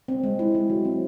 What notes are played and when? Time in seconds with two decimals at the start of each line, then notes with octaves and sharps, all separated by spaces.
0.08 C4
0.24 G#3
0.39 E4
0.55 G#3
0.70 F#3
0.85 C4